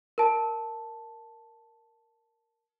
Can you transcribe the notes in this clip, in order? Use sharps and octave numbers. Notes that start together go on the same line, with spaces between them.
A#4 A5